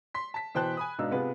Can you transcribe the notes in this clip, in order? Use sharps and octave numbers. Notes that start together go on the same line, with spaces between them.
C6 B6
A5 B6
B2 E3 C5 G5 A5 F#6
G#5 B5 D#6
G#2 B2 D4 D#4 F5 E6
C3 B3 F4 G#4 B4